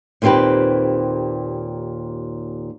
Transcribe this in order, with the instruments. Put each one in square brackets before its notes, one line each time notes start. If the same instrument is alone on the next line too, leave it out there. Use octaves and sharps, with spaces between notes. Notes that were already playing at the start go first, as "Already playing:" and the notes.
[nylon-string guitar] D#2 A#2 C4 E4 G4 B4